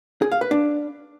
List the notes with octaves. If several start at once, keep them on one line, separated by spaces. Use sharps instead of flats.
G#4
F5
B4
D4